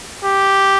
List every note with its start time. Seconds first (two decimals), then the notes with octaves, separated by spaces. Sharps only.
0.25 G4